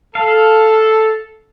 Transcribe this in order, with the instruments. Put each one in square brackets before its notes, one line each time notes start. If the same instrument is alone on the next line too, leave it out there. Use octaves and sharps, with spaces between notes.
[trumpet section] A4 [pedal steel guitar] F5